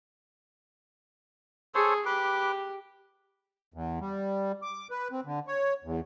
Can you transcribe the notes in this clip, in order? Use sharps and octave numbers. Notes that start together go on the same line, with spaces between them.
G#4 A4 C5 C#5
G4 B4 D6
E2
G3
D6
B4
C4
D3
C#5
E2